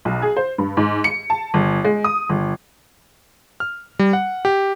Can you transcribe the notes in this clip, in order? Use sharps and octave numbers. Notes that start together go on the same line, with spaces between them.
B1
G#4
C5
G2
G#2
C#7
A5
G1
G#3
D#6
G1
F6
G3
F#5
G4